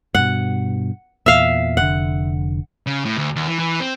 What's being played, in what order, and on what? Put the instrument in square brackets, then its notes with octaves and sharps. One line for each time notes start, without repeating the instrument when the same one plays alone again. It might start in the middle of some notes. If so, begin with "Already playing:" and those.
[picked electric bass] G2 B2 [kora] F#5
[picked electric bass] E2 A#2 [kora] E5 F5
[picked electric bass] F1 D3 [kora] F#5
[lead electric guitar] C#3
A2
D2
D#2
E3
E3
C4